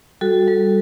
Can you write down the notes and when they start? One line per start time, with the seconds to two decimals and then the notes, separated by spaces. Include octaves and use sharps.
0.21 G3 F#4 A4
0.48 G3